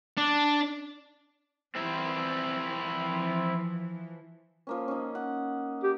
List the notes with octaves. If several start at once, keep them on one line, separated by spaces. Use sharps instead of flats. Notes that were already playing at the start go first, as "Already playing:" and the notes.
D4
E3 F3 C4 E4
F3 A#3 C#4
C#4 D#4
F#5
G4